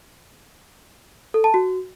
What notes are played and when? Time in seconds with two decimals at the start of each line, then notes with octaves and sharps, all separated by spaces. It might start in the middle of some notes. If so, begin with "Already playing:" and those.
1.34 A4
1.44 A5
1.54 F#4